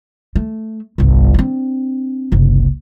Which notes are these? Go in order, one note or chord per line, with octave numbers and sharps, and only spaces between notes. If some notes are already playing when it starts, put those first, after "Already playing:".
A3
G1 C2
C4 D4
F#1 C2